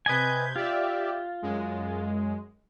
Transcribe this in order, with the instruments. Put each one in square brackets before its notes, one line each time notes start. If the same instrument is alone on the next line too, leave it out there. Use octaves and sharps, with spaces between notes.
[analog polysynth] C3 G6 G#6 [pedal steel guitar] B4 D#5 G#5
[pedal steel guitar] F4 [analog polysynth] G4 D5 E5
[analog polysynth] F#2 G#3